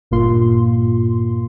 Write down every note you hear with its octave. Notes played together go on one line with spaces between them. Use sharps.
G#1 G2 A#2 A#3 F4 C6